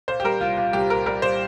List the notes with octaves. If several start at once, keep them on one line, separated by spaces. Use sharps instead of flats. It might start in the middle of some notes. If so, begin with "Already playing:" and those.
A#2 C5
G4
G3 A#4
C2 F4
A#2 F4
C2 G4
A#2 A#4
G3 A#4
A#2 C5